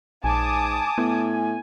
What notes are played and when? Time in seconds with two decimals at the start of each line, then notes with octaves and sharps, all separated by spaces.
0.24 A#1 G#2 G#5 A5 D6 D#6
0.98 A2 B3